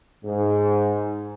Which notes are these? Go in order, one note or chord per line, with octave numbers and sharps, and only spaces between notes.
G#2